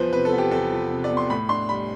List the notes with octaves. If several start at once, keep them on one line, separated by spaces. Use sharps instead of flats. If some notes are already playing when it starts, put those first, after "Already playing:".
Already playing: E2 F3 B4 C5
C3 B4
A4
B3
G4
E2 A4
F3
C3
D5
B3
C6
A2 B5
D4 C6
G3 B5